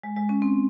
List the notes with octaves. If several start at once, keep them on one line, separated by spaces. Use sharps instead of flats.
G#3
G#3
C#4
C4